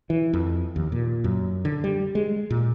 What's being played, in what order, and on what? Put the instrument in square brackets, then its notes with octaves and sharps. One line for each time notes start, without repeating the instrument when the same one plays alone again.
[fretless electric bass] E3
F2
D#2
A#2
F#2
D3
G3
G#3
A#2